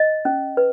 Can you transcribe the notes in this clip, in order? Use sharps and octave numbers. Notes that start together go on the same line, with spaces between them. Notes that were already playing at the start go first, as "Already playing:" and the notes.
Already playing: D#5
C#4
B4